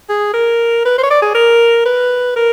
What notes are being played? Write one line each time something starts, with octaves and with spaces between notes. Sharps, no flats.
G#4
A#4
B4
C5
C#5
D5
G#4
A#4
B4
A#4